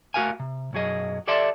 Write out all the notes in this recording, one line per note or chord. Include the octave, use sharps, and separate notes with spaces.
A3 F#4 A#4 F5 G#5
C3
B1 F#2 F#3 G#4 D#5
G4 A4 D5 E5 A5 C6